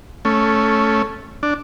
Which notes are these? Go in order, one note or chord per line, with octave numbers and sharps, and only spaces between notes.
A3 C#4
D4